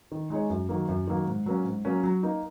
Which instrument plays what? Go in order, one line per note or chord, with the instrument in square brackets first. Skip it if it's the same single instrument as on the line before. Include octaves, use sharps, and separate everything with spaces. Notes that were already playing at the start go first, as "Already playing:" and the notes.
[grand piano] D#3
G#3 D#4 G#4 C#5
F#2
D#3 F#3 A#3
F#2
D#3 F#3 A#3
G#2
F#3 A#3 C#4
G#2
F#3 A#3 C#4
F#3
A#3 D#4